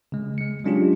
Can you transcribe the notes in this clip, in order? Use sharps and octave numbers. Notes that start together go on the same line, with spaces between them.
C#3 G#3
G#3 C#7
F#3 G#3 C#4 D4 F4 G4